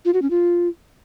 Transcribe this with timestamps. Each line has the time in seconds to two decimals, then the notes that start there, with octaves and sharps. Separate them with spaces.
0.05 F4
0.14 F#4
0.22 C#4
0.30 F4